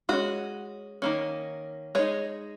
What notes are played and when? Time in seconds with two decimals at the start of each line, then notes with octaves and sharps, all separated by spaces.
0.09 G#3 C#4 F#4
1.02 D#3 A#3 C#4
1.95 G#3 D#4 G#4 C#5